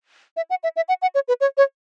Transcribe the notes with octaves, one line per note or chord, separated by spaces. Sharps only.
E5
F#5
E5
E5
F#5
F#5
C#5
B4
C#5
C#5